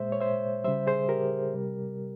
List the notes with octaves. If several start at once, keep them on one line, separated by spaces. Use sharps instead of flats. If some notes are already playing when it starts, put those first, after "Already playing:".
Already playing: A#2 G#3 C5 E5
C#5
C5 E5
C#3 G3 C5 E5
G#4 C5
G4 A#4
C3 G3